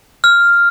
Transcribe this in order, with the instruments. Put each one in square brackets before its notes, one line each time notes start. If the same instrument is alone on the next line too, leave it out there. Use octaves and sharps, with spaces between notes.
[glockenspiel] F6